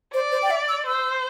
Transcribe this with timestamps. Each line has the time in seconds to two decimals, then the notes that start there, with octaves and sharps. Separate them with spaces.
0.14 C5 D5
0.32 C5
0.42 G5
0.50 E5
0.69 E6
0.87 C5 E6